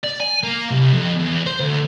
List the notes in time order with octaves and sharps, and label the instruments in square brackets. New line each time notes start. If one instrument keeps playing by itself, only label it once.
[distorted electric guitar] D5
G#5
A#3
C2
F2
E2
C5
D2